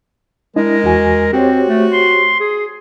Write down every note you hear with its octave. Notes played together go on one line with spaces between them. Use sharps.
G#3 D4 E4 A#4 D#5
E2 F#4 G#5
C4 F#4 G4 C5 C#5
A3
C6
G#4